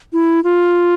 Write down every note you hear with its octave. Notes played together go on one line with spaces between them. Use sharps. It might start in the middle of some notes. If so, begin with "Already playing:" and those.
E4
F4